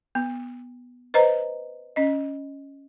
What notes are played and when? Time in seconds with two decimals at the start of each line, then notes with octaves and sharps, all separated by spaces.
0.15 B3
1.14 B4 C5 D#5 A#5
1.96 C#4 D#5